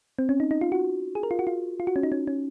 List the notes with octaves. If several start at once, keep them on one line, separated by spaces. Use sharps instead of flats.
C4
C#4
D#4
D#4
F4
F#4
G#4
A#4
F4
F#4
F4
F4
F#4
C#4
D#4
C#4
C#4